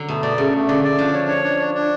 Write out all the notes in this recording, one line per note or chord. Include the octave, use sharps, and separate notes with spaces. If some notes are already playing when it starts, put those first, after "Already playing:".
Already playing: D3 F#3
B2 A3
B2 D5
C#3 A3
A3
D3 D5
D5
F3 D4
C#5
C#5
D4
D4
D4